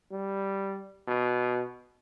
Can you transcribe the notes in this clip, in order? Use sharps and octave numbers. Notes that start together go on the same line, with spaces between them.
G3
B2